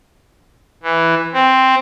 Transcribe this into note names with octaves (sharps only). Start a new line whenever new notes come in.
E3
C4